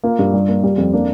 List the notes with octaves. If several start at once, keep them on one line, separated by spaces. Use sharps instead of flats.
A#3 F4
G2
G3
A#3
G3
F2
A#3 D4